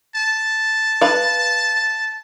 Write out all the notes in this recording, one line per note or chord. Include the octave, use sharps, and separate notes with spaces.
A5
B4 F5